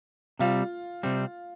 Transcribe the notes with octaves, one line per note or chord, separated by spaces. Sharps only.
C3 G3 C4 F4
C3 G3 C4